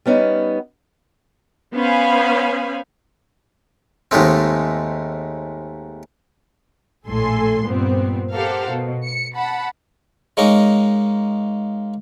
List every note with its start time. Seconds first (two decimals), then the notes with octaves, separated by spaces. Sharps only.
0.06 G3 B3 C#4 D#4
1.75 B3 C#4 C5 F5 G#5 B5
4.11 D#2 G#2 G#3 A3 C4
7.06 A#1 A2 A4 G#5 C6
7.64 G2 A#2 B3 C4
8.33 G4 A4 A#4 C5 F5 F#5
8.70 B2
9.03 C#7
9.35 F#5 A5 B5
10.37 G#3 A#3 C#4 D#4 A#4